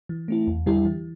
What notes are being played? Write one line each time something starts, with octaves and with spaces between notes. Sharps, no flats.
E3
A3 C4 E4
E2
D3 G3 E4 G4
E3